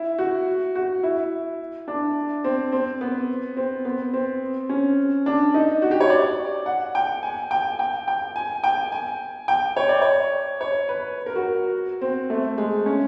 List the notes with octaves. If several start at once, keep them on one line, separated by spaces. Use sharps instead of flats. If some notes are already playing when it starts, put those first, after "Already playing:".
Already playing: E4
F#4
F#4
E4
D4
C4
C4
B3
C4
B3
C4
C#4
D4
D#4
F#4
G4
C#5
D5
F#5
G5
G#5
G5
G5
G5
G#5
G5
G#5
G5
C#5
D5
C#5
C#5
B4
A#4
F#4
C4
A3
G#3
C#4